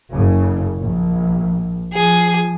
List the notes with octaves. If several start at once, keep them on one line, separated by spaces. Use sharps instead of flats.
F#1 C#3
A#1
F3 G#4